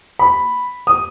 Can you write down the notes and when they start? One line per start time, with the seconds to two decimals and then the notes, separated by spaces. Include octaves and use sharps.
0.19 B5
0.87 D#6